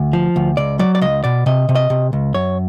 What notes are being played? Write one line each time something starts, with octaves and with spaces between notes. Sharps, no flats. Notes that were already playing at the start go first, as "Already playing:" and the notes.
Already playing: D2
F3
D2
C#2 D5
F#3 D5
D5
C#2 D#5
B2 D5
C3 D#5
C3
D#5
C3
C#2
F#2 C#5